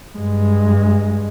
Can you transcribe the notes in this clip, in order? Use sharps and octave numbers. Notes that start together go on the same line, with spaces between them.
G2 G#3